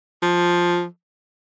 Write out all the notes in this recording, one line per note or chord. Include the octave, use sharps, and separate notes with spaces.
F3